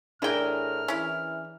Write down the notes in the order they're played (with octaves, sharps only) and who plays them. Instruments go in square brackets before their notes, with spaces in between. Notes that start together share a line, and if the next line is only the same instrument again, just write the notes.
[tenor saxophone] A2 [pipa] E3 G5 [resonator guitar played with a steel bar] D4 G#4 A#4 [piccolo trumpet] F6
[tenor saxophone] E3 [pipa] C#4 E4